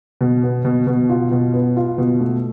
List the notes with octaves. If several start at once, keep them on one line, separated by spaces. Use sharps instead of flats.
B2
B3
B2
B2
F4
B2
B3
F4
B2
A3